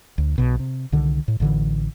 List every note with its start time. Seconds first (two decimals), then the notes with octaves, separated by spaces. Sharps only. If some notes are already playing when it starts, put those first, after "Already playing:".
0.18 D2
0.38 B1 B2
0.59 C3
0.92 C2 D3 D#3
1.28 A2
1.40 A1 D3 E3